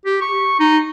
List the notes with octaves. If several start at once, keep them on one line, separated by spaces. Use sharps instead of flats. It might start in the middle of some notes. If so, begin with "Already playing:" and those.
G4
C#6
D#4